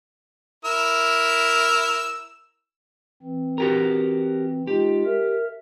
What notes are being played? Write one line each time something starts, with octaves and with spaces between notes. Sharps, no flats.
E4 A#4 E6
E3 C4
F#4 G4 A#4
G#3 D#4 F4 G4
A#4 E5